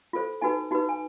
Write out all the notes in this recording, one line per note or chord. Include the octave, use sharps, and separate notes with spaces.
F4 A4 C5
D#4 F#4 B4 G#5
D#4 F#4 B4
G#5